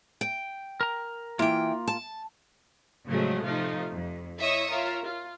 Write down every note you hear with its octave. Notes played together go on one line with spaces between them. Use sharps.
G5
A#4 A#5
E3 A#3 F4 G5
A5
A2 C#3 F3 F#3 G#3 A3
C3 F3 A3 D#4 F4
F2
E4 C#5 D#5 E5 C#6 D#6
F4 A#4 C#5 E5
F4